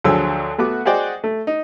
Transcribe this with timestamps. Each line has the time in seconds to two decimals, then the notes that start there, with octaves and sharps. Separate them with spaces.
0.04 D2 F3 F#3 G#4 A4 E6
0.58 A3 B3 F#4 D6
0.85 F#4 G#4 C5 D5 D#5 G5
1.24 A3
1.47 D#4